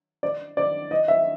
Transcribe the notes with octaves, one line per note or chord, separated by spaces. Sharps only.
D5
D5
D#5
E5